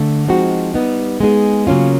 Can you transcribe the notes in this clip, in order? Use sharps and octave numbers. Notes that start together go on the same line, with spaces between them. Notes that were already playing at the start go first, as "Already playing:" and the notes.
Already playing: D3 A3
F3 G#3 C4 D#4 F#4
G3 B3 D#4
G#3 B3 D#4 G#4
C#3 F#3 A#3 C#4 F4